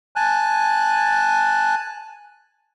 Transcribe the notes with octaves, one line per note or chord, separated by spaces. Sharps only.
G#5 A5 F#6